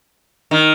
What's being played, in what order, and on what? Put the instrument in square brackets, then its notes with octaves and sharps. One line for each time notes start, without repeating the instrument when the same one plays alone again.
[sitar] D#3